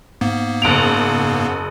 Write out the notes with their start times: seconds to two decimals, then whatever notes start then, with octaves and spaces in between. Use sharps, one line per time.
0.21 G#2 A#3 B3
0.62 F#1 D7 F7